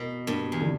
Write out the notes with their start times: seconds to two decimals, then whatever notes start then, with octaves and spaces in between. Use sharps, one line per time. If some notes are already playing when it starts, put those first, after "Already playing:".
Already playing: B2 A#4
0.27 G2 A#3
0.52 E2
0.61 D3